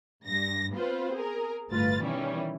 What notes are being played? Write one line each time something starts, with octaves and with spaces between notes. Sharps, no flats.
G2 A#6
B3 C4 F4 B4 C5
G#4 A#4
G1 D2 A2 F4 B4 A6
B2 D#3 E3 G3 C#4 E4